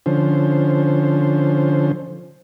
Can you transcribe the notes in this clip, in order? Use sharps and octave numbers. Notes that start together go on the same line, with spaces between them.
D3 F3 C#4 C5